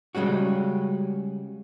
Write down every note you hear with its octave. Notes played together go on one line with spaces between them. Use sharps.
C#3 G3 G#3 C#4 F#4